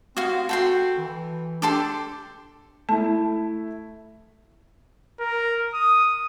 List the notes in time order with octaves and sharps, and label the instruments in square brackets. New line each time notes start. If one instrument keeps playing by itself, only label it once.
[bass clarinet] C4 [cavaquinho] F#4 F5
[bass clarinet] F#4 [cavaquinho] A4 G5 C6
[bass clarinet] E3
[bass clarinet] D4 [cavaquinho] G4 A4 C6
[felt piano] A3 E4 [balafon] A5
[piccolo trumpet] A#4
D#6